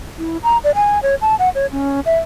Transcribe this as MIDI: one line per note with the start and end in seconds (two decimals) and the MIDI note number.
0.18 0.37 64
0.43 0.58 82
0.64 0.71 74
0.75 1.01 80
1.03 1.15 73
1.21 1.35 81
1.39 1.49 78
1.55 1.66 73
1.71 2.00 61
2.06 2.18 76